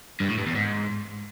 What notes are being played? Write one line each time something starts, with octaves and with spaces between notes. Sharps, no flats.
G2
A2
G2
E2
G#2